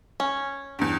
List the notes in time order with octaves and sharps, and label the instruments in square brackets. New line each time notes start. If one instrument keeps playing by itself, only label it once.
[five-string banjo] C#4
[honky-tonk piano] E2 G2